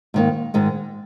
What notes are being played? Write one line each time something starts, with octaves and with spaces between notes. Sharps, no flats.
G#2 D#3 A#3
G#2 D#3 G#3